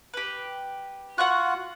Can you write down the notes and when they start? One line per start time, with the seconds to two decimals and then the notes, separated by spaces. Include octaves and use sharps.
0.14 G4 B4
1.18 F4 F#4 F#5 C#6 F#6